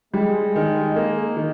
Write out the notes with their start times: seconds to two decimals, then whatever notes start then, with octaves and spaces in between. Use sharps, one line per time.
0.14 G3 G#3
0.56 D#3
0.96 A#3
1.37 D#3